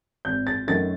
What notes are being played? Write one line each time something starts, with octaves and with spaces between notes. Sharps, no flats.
G#1 G6
A6
F#2 D#3 F#3 A3 A6